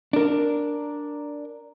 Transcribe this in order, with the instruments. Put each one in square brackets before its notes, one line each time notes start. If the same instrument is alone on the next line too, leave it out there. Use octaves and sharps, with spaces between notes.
[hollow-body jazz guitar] D4 A#4